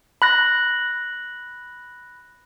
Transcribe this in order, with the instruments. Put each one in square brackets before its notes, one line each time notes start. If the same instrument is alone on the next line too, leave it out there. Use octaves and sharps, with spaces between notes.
[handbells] B5 F#6 A#6